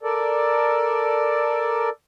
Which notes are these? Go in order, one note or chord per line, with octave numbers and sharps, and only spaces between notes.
A4 A#4 D5